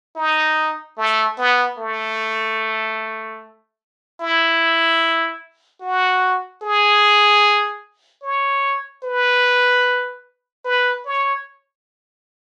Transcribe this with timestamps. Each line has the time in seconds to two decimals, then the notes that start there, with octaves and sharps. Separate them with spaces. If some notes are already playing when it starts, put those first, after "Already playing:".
0.16 D#4
0.97 A3
1.38 B3
1.78 A3
4.20 E4
5.81 F#4
6.62 G#4
8.23 C#5
9.03 B4
10.65 B4
11.05 C#5